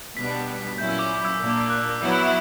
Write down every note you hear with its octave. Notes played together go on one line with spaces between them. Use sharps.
B2 G3 B3 D4 B6
A#2 F#3 C#4 E4 G6
E6
D6
D6
E6
A#2 A#3 D4 E6
D6
E6
F#6
E6
D6
F#3 B3 E4 E6